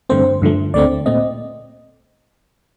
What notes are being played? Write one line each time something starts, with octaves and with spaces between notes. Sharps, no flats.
G2 D3 A3 C4 C5
G2 D3 F3 A3
D2 D3 A3 C4 D5
A#2 A3 C4 D#5